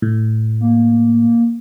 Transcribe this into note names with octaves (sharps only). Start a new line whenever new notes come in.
A2
A#3